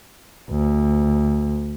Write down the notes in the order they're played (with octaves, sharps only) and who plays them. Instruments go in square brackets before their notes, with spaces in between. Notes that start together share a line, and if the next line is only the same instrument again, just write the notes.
[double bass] D2